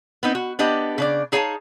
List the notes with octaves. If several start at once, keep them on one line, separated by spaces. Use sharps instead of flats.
B3 C4 D#4
F#4
B3 D4 G4 D#5
C#3 D4 D5
D#4 G#4 C#5 F5 F#5 A5